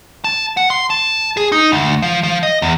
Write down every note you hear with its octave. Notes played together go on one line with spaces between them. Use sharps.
A5
F#5
C6
A5
G#4
D#4
D2
F3
F3
D#5
E2